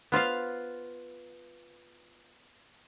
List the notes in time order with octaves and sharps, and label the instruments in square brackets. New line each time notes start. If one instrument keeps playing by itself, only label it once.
[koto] B3 F4 C5 F5